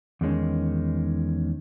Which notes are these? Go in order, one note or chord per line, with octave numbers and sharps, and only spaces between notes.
E2 D#3 G#3 C#4